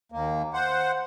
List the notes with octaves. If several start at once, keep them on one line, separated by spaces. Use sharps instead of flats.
D#2 A#3
C5 F#5